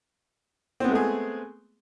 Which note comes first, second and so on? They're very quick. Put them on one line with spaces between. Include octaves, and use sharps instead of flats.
C4 B3 G#3 A3 G#4